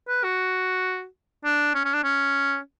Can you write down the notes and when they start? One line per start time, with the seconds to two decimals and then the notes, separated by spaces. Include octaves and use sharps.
0.08 B4
0.24 F#4
1.45 D4
1.75 C#4
1.85 C#4
1.94 D4
2.04 C#4